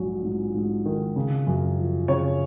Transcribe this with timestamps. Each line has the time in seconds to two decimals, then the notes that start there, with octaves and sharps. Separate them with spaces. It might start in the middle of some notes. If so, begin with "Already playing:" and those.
Already playing: A#1 G#2 F#3
0.23 G#2
0.54 G#2
0.86 D#3
1.16 C#3
1.47 F#2
1.78 F3
2.08 C#3 C#5